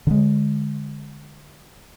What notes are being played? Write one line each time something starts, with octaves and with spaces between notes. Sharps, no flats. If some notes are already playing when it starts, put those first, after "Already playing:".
D3 G#3